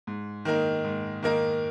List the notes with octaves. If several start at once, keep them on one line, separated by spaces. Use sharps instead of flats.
G#2
D#3 A#3 D#4 A#4
G#2
D#3 A#3 D#4 A#4